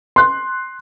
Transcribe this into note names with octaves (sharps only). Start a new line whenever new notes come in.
C6 F#6